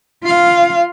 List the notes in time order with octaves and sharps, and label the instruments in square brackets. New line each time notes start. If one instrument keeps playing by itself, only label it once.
[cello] F4 F5